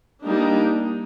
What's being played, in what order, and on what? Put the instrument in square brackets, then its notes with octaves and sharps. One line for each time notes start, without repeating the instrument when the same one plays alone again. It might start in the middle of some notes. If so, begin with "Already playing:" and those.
[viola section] G3 A#3 D4 D#4